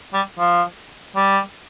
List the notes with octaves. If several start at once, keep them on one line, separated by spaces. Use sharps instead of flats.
G3
F3
G3